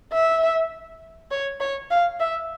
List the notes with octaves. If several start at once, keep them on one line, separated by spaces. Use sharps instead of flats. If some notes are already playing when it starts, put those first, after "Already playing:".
E5
C#5
C#5
F5
E5